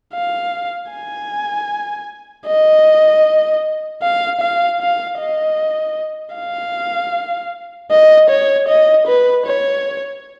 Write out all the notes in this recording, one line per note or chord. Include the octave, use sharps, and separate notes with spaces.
F5
G#5
D#5
F5
F5
F5
D#5
F5
D#5
C#5
D#5
B4
C#5